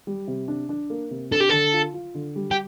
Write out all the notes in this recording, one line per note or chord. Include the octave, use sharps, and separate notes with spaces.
G3
C3
D4
D4
A#3
C3
D4 A4
G4
D3 A4
F4
F4
D3
G3
G4